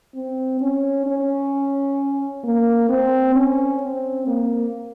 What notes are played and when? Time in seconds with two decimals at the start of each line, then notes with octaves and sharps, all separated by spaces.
0.15 C4
0.61 C#4
1.07 C#4
2.44 A#3
2.89 C4
3.35 C#4
3.82 C4
4.27 A#3